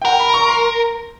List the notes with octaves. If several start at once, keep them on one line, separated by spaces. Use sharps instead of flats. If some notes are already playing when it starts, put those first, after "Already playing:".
G5
A#4 F#5
B5
C#6
C6